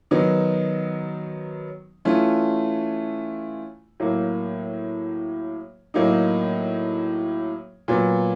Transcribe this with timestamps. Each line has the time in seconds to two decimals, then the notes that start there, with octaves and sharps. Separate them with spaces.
0.11 D#3 F#3 B3 D#4
2.05 E3 A3 C#4 F4
4.00 A2 F#3 A#3
5.94 A2 F#3 A#3 D#4
7.88 A#2 F#3 B3